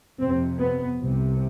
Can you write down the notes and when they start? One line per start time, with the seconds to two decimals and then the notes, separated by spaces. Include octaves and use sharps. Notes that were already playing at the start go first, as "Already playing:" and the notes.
0.21 F2 C3 C4
0.60 B3
1.01 C2 C3